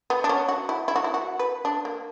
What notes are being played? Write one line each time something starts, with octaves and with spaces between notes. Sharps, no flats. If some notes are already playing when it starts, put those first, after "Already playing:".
B3
D4
C#4
F#4
E4
E4
F#4
E4
F#4
B4
D4
A#3